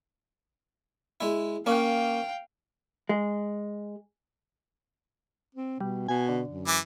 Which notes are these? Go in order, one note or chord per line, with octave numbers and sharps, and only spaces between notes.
G#3 E4
A#3 C#4 F5 G5
G#3
C4
B2 G3
B2 G#5
D3
F#2
E3 D6